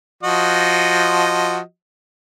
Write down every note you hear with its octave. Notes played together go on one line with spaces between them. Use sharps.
F3 F#4 D#5